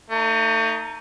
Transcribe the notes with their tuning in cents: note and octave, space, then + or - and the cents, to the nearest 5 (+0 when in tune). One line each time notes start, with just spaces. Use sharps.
A3 +40 D#4 +0